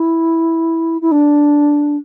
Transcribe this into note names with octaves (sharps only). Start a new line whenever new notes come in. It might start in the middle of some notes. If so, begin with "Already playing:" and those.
Already playing: E4
E4
D4